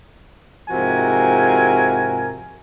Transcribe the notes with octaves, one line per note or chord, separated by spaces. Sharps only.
G#2 C3 F3 F#4 A#4 G#5